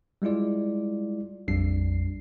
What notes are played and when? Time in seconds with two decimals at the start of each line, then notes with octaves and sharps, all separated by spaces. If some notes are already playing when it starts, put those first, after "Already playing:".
0.22 G3 G#3 E4 F4 D5
1.48 A#1 F2 G3 D4 C7